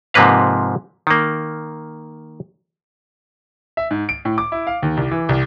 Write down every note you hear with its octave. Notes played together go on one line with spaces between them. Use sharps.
G#2 C3 F3 A#3 B4 F5
D#3 A#3
E5
G#2
D7
A2
D6
E4
F5
D#2
C2
E3
C2